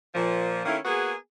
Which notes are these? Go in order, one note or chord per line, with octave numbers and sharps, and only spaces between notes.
A#2 F3
D#3 A3 A#3 C#4 E4
A#3 B3 F#4 G#4